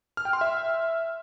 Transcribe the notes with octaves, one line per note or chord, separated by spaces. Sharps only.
F6
G5
C6
E5